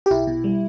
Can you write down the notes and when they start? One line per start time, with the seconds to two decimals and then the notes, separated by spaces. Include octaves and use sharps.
0.06 G4
0.10 B1 E4
0.27 B2
0.44 G3